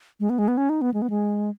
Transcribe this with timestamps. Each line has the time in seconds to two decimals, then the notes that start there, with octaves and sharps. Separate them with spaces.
0.20 G#3
0.30 B3
0.39 G#3
0.48 B3
0.57 C#4
0.69 D#4
0.81 B3
0.94 G#3
1.02 B3
1.10 G#3